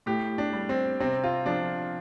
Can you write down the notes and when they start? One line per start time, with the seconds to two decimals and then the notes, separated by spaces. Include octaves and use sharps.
0.06 A2 G4
0.38 D4
0.53 G3
0.69 C4
1.00 C3 C4
1.24 F4
1.46 F3 D4